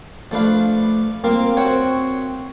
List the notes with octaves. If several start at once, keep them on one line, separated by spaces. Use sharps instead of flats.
F3 A3 D4 B4 F5
A#3 C4 F4 A#4
C4 F#4 C5 C#5 F#5